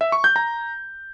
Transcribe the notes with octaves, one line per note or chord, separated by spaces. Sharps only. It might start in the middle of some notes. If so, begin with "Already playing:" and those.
E5
C#6
G6
A#5